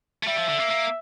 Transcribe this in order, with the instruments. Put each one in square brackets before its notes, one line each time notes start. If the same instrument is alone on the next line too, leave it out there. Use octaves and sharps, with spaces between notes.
[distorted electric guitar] A3
[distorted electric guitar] G3 [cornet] E5
[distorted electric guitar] F3
D3
A#3
A#3